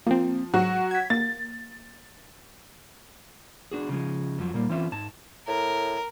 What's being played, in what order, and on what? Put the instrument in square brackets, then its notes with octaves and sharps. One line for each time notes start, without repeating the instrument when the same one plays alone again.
[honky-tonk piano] F3 [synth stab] A#3 C4
[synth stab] G#2 [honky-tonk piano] F#3 F#4 F#5
[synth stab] G#6 B6
[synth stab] A#3 [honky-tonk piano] A6
[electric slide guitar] D4 F#4 G#4
C#3 F3 G#3
F2 F3 F#3
A#2 G3 A#3
E3 C4 C#4 F4 E5
G#2 A5
[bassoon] A2 [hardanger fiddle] A#4